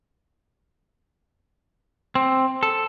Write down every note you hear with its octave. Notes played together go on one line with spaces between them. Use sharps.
C4
A4